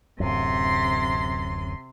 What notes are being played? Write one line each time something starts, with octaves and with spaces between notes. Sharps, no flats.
D1 F#2 C3 C6